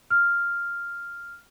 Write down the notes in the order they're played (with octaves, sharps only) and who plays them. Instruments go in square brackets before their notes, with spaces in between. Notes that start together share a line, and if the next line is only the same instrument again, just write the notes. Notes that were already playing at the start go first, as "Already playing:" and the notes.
[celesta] F6